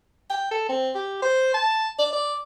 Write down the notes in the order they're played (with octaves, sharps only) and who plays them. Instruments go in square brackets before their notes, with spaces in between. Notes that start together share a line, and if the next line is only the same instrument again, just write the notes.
[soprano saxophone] G5
A4
C4
G4
C5
A5
D5
D5